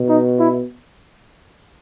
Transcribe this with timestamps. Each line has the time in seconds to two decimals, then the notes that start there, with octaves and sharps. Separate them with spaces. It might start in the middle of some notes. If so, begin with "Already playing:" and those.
Already playing: B2
0.09 D#4
0.39 E4